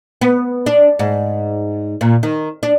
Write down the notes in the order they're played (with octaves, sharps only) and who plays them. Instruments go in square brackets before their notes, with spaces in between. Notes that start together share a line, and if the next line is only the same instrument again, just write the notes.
[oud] B3
D4
G#2
A#2
D#3
D4